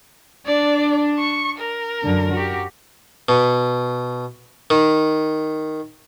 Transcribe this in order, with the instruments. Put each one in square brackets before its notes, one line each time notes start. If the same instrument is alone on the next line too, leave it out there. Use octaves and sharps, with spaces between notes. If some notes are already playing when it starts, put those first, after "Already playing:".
[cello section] D4 [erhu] D5
[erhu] C#6
A#4
[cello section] F#2 D3
F#4 G4
[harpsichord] B2
D#3